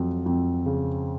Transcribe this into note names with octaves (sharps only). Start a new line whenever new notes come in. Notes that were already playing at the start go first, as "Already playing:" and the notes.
Already playing: F2 F#3
F2
C#3